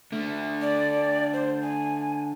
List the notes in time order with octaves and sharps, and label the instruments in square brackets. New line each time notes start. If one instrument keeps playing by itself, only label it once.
[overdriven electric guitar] D3 A3
[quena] D5
C5
G#5